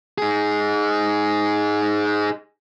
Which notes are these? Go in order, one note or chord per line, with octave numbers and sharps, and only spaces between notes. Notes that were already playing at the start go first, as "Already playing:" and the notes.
D#4 G#4